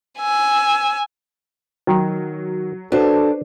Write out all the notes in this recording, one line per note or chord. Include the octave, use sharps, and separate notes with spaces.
G#5 E6
D#3 F#3
D4 F#4 A4 B4 C5